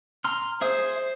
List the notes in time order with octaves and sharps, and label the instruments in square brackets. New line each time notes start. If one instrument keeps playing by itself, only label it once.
[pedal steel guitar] A#5 C6 F6
[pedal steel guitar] G#4 E5 D#6 [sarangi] C5